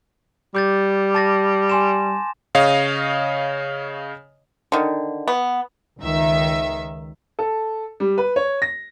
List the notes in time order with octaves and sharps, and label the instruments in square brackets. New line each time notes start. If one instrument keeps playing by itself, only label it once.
[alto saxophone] G3 [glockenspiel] D6 G6 A6
[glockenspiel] A5 A6 A#6
G#5 C6 E7
[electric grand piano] C#3 C#5 D#5 F5 D#6
[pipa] D3 D#3
B3
[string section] C#2 D#3 E5
[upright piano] A4
G3
B4
C#5
A#6